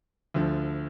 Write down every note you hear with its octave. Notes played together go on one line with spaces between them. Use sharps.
D2 D3 F3